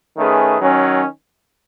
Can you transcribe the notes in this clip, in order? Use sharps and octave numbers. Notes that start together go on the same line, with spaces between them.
D#3 A3 C#4 G#4 B4
D#3 F#3 C#4